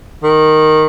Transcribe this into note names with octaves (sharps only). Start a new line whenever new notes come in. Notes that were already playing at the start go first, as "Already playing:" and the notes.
D#3